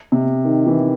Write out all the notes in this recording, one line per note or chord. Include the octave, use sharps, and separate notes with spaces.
C3
D#3
E3